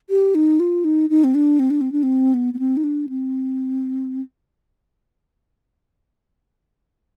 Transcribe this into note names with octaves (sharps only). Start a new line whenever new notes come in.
G4
D#4
F4
D#4
D#4
C4
D4
C4
D4
C4
D4
C4
B3
B3
C4
D#4
D4
C4